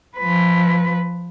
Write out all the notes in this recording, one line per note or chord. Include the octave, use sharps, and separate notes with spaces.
F3 B4